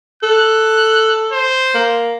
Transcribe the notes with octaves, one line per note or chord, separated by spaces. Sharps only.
A4 F#6
C5
A#3